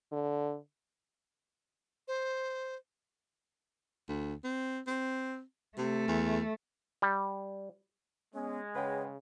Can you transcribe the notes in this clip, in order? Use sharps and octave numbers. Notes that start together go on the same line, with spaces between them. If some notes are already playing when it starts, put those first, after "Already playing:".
D3
C5
D2
C4
C4
C3 A3
E2
G3
G#3 B3 C#4
C#3 B4 C#5 F#5 G5